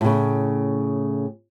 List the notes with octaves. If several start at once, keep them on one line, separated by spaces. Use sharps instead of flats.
A2 C#3